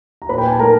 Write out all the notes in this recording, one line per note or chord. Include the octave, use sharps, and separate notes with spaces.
A#5
A#2 B4 B5
G5
G#5
A5
A3 A#4 A#5